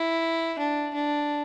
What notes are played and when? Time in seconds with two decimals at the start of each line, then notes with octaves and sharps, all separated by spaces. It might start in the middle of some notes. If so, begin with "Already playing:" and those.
Already playing: E4
0.59 D4
0.94 D4